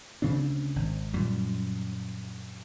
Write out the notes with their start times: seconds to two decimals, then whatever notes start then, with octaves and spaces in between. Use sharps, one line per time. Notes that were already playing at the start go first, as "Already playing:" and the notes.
0.22 D2 C#3 C4 D4
0.76 G#1
1.13 F#2 A#2 G3